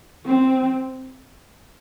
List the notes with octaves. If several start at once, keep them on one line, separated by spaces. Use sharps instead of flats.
C4